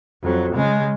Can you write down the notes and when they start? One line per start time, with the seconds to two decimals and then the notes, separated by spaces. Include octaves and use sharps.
0.23 F2 F#3
0.55 C#3 G#3